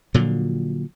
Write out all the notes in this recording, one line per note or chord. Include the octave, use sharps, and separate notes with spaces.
A#2 D3 F3 F#3